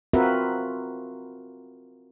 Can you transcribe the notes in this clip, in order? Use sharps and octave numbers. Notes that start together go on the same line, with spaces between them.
C4 F4 F#4 A#4 B4 E5